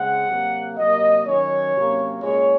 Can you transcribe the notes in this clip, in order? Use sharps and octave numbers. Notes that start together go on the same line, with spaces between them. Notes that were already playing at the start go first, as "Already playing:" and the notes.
Already playing: C#3 G#3 C4 F#5
C3 F#3 A#3
C3 F#3 A#3 D#5
D#3 F#3 C#4 C#5
C3 F#3 A#3 C#4
A#2 G#3 C#4 C#5